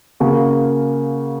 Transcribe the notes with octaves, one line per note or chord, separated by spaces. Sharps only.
C#3 A#3 F#4